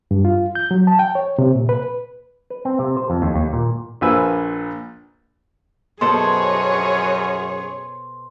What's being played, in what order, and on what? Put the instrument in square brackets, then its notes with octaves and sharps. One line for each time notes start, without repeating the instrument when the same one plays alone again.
[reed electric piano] G2
F4
G6
F#3
A5
G5
C#5
C3
A#2
B4
[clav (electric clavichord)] B4
C4
C3
C5
F2
D#2
D#2
A#2
[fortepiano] A#1 A#2 F3 B4 G#5 E6
[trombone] F#2 [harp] B2 A4 C5 [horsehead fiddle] G#4 C#5 [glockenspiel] C6